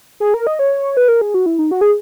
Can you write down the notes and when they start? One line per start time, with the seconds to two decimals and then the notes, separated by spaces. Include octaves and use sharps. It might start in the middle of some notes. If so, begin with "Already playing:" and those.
0.20 G#4
0.34 A#4
0.47 D#5
0.59 C#5
0.97 B4
1.08 A#4
1.21 G#4
1.34 F#4
1.46 E4
1.59 D#4
1.71 F#4
1.81 G#4